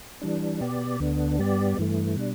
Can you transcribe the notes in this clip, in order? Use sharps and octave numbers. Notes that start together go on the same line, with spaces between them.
E3 G3 D4
B2 B3 G4 D5
D2 D3 B3 D4
G2 G3 B3 G4 D5
G2 E3 A3
B2 G3 D4